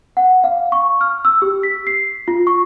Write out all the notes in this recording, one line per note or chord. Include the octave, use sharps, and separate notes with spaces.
F#5
F5
C#6
F6
E6
G4
B6
C7
F4
C#6